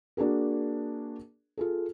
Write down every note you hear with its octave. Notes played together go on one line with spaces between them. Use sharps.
A#3 D4 F#4 G#4 A#4
F4 G#4 A4